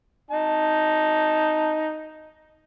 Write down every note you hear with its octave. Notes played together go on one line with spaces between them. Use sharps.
D#4 A5